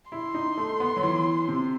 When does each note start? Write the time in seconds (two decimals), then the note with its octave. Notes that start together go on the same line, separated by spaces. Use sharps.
0.11 E4 C6
0.34 D#4
0.57 A3
0.80 B3
0.96 F#3
1.03 E3
1.48 C3